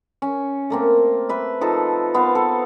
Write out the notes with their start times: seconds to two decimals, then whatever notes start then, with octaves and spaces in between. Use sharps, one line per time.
0.22 C#4
0.70 A3 A#3 C4
1.29 B4 E5
1.61 F3 D#4 A4
2.14 B3 C5 F5
2.35 A4